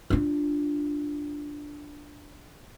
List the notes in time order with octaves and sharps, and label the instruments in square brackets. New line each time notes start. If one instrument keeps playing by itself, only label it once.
[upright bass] D4 F4